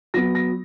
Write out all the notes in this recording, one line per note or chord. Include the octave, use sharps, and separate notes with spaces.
F#3 B3 A#6
A#6